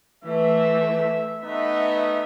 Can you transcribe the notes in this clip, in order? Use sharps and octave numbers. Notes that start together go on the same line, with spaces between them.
E3 A3 E5
A3 B3 D#4 E5